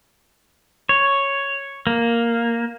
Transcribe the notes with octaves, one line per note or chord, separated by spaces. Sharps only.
C#5
A#3